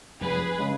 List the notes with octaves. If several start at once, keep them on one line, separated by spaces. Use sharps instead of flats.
F1 G#4 B4
C#3 G#3